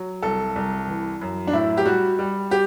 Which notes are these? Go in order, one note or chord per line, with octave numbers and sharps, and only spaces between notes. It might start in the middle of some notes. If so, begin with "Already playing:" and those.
Already playing: F#3
C2 A4
C2
E3
F#2
D4
A2 E4
G4
G3 F#4
G3
G4